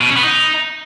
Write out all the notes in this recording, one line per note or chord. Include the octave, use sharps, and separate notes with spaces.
B2
C#4
B3
D#4